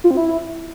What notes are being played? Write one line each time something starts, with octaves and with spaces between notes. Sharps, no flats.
F4
C4
E4